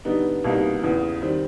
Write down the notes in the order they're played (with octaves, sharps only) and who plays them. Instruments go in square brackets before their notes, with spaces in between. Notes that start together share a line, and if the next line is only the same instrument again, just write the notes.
[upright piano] D3 G3 B3 D#4
C2 B2 G3 A#3 D#4
E2 C#3 E3
D#3 G3 C4